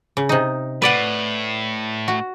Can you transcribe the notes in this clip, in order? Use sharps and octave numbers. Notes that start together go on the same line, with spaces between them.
C#3
C3 D#4
A2 B4 D5 F#5
F#4